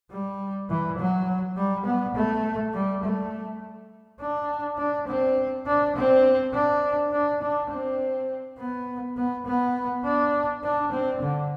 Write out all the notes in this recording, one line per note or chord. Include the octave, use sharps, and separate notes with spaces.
G3
E3
F#3
G3
B3
A3
G3
A3
D4
D4
C4
D4
C4
D4
D4
D4
C4
B3
B3
B3
D4
D4
C4
D3